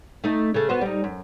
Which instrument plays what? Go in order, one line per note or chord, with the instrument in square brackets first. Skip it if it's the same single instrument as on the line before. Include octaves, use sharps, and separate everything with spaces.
[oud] A3 D#4
C#3 A3
B3 F#4 C5
G3 D#4
F#2